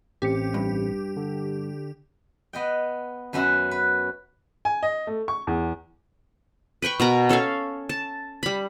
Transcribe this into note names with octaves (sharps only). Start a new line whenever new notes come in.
A1 C4 G4 C#7
G2
D3
B3 D#5 G5
F#2 B3 C#4 F#4 E5
B4
G#5
D#5
A3
C#6
E2
B4 G5 B5 C#6
B2 A#4 A#5
C#4 A4 C#5 F5
A5
G3 B5